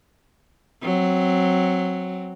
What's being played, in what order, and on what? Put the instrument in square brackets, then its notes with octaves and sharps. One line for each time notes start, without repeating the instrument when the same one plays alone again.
[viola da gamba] F#3 C4